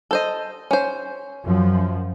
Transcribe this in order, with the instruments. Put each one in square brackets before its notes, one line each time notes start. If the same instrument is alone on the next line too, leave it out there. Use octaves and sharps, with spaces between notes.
[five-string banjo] A4 C5 D#5
C#4 C5
[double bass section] F#2 F3